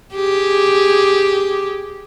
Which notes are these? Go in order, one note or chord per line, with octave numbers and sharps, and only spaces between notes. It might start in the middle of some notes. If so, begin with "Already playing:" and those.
G4 G#4